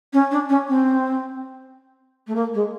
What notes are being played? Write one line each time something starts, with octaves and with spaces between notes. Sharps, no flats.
C#4
D4
C#4
C4
A3
A#3
G#3